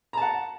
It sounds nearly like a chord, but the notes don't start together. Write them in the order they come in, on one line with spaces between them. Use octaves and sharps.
A#5 A5 F#5